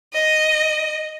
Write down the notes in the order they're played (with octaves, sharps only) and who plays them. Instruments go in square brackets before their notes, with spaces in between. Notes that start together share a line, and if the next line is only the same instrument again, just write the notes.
[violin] D#5